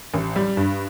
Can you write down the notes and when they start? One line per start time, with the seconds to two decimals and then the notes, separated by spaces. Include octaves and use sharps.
0.14 A1
0.36 G3
0.57 G2